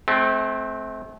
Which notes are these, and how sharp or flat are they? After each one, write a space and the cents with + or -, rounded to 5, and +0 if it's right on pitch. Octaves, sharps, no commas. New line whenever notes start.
A3 -35 C4 +0